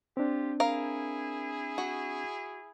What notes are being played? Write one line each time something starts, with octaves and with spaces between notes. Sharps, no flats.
C4 D4 F4 G4
E4 G#4 A#4 F5
F#4